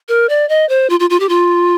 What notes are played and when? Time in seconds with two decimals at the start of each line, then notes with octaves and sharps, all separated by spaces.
0.08 A#4
0.29 D5
0.49 D#5
0.69 C5
0.90 F4
1.00 F4
1.10 F4
1.20 G4
1.29 F4